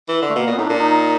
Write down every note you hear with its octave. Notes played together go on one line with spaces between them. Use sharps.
E3
D3
A3
B2 A#3
A#2 B3
A2 D#4
A#2 D4
D#4